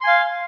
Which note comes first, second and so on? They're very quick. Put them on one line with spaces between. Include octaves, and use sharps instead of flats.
C6 G#5 F5